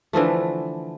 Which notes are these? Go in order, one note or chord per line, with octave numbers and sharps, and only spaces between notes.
D3 E3 F3 A3